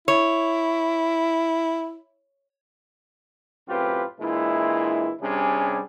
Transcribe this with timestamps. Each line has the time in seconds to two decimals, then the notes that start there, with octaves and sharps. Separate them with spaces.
0.08 E4 C#5
3.68 F#2 A2 C4 F4 G4 B4
4.20 A#2 E3 G#3 D4 E4
5.21 C3 G3 C#4 D4 G#4